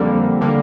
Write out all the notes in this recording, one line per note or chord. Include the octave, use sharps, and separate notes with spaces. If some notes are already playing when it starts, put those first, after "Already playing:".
Already playing: F2 D3 G3 A#3
D3 G3 A#3